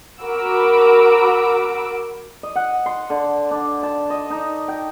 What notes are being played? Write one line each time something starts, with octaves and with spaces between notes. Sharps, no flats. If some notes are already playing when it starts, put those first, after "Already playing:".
F#4 A#4 B5 D6 E6 D7
D#5
F#5
C6
D3
D4
A5
D#5
D#4
G5